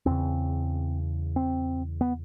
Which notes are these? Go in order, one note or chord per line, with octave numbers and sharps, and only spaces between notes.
E2 C#3 C4
C4
B3